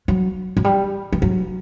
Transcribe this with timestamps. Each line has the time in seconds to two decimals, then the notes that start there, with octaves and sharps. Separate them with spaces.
0.08 F#3
0.57 F#3
0.64 G3
1.13 E3
1.22 F#3